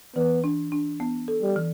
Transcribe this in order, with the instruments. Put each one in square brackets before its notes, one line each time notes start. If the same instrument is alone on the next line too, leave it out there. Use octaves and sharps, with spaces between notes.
[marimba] E3 [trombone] B3
[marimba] D4
D4
B3
A4
[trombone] G3
[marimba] E3